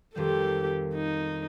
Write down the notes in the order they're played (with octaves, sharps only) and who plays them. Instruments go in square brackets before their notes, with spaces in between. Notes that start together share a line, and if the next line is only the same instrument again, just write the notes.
[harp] F2 D#3 G3 [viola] G4 A4
[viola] D#4